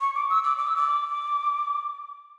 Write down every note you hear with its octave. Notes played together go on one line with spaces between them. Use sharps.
C#6
D6
E6
D6
D6
E6
D6